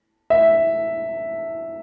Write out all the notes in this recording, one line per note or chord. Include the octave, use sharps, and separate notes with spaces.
E5